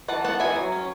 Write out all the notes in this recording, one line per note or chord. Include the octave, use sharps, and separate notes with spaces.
E3 F#5 A5
B3 F#5 A5
E3 E5 G#5
F#3
C#4